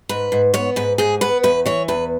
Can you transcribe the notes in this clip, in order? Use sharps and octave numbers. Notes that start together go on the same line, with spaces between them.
G#2 B4
G#2
B3 C#5
G#2 B4
G#2 G#4
B3 B4
E2 B4
E3 C#5
E2 B4